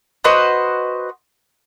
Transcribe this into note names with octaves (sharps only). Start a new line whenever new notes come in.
F#4 B4 C5 D#5